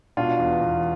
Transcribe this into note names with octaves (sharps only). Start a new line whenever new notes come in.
B2 D4 F4
E2
E2